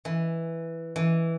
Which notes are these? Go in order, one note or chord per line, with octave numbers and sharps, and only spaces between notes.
E3
E3